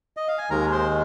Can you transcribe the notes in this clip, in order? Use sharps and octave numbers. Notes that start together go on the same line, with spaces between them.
D#5
F5
G#5
D#2 D#3 G#3 A#4 A#5
C5 C6